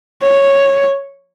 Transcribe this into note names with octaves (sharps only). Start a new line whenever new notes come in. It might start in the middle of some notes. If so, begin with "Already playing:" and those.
C#5